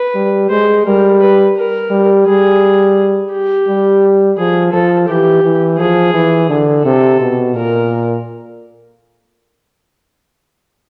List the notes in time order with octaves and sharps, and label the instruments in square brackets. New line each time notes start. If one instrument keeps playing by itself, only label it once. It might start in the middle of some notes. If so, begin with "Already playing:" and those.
Already playing: [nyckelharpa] B4
[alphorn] G3
[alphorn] G#3 [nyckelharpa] C5
[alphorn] G3 [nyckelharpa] A#4
[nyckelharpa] B4
A#4
[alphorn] G3
[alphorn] G3 [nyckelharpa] G#4
[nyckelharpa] G4
[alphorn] G3
[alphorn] F3 [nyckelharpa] G#4
[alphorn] F3 [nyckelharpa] A4
[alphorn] E3 [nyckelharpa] G4
[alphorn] E3
[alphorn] F3 [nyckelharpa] G#4
[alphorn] E3
D3
[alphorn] C3 [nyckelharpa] A4
[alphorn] B2
[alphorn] A#2 [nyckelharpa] A#4